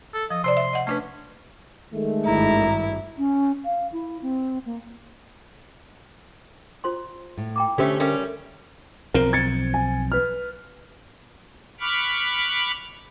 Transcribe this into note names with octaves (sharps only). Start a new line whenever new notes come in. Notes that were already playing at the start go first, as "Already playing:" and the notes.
A4
F3 D#5
C3 C5 D5 C6
E5
D#5 F#5
A3 C#4 D4 B4
D#3 G#3 A3
G#1 G2 E4 A#5
C#4
F5
E4
C4
A#3
F4 C5 C6
A2
G5 A#5 D6
D3 A3 C#4 G4 A4 C5
G3 C#4 A4 A#4 E5
B1 F3 C4 A#4
G#6 A6 C#7
G#5
B4 F6
B5 C#6 D6 F6 F#6